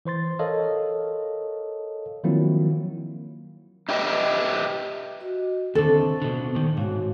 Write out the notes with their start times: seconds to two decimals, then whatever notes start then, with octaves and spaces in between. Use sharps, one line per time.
0.05 E3 C5 C6 A6
0.39 A4 A#4 C#5 D#5 F5
2.24 D#3 F3 F#3 A#3 C4 E4
3.89 D#4 E4 G4 B4 D#5 E5
5.20 F#4 D#5
5.75 D#2 D3 C4 A4 C5 C#6
6.22 B2 D3
6.55 A#2 D#3
6.77 G#2 F#4 C#5 F5